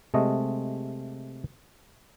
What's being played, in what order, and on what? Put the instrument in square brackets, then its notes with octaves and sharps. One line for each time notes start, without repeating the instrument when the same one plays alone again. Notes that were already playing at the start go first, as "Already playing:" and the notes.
[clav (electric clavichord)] C3 G#3 A3 D#5